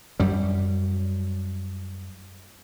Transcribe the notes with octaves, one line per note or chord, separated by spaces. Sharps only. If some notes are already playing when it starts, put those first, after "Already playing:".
F#2 G3